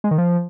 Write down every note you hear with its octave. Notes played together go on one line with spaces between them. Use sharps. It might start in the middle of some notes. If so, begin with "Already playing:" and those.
G#3
D#3
F3